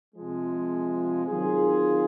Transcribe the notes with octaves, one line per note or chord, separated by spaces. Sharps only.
C3 F3 G#3
D#3 F#3 C4 F4 G#4